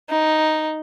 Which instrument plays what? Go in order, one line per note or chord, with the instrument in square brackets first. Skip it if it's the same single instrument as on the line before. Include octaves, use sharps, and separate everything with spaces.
[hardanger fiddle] D#4